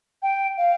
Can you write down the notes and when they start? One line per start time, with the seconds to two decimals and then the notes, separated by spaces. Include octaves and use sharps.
0.22 G5
0.58 F5